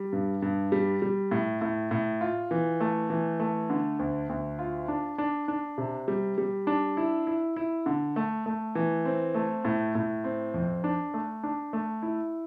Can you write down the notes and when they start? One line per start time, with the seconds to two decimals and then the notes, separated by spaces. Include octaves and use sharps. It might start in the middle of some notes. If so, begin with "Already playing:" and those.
Already playing: G3
0.13 G2
0.42 G2
0.72 G3
1.02 G3
1.31 A2
1.61 A2
1.91 A2
2.21 F4
2.51 E3
2.80 A3
3.10 E3
3.40 A3
3.70 D3
3.99 D2
4.29 D2
4.59 F4
4.88 D4
5.18 D4
5.48 D4
5.78 C3
6.08 G3
6.38 G3
6.67 D4
6.97 E4
7.27 E4
7.56 E4
7.86 D3
8.16 A3
8.46 A3
8.75 E3
9.05 C4
9.35 A3
9.65 A2
9.95 A2
10.24 C4
10.54 F2
10.84 D4
11.14 A3
11.43 D4
11.73 A3
12.02 E4